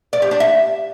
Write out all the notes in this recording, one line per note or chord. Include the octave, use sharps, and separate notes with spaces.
D5
G4
D4
E5